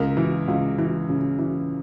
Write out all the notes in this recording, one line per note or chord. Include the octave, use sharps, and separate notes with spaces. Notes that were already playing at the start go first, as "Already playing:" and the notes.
Already playing: C#2 A#4
E3
C#2
E3
C#3
E3